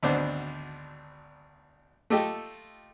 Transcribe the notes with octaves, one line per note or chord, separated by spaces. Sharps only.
G#1 D2 B3 D4 C5
A3 F4 G4 A4 D#5 G5